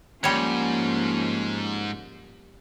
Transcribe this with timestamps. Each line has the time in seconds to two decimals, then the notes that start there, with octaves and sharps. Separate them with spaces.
0.24 G#2 F3 G3 A#3 C#4 C#5